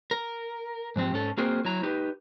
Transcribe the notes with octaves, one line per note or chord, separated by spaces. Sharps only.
A#4
G#2 F3 C4 G4
G#2 C#4 A4
A#3 C4 F#4 G#4 A#4 C5
F#3 E4 A#5
D#4 G4 B4